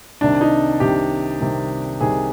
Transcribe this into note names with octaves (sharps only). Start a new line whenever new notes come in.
C2 C3 D#3 D4
D#4
C2 C3 D#3 G4
C2 C3 D#3
C2 C3 D#3 G#4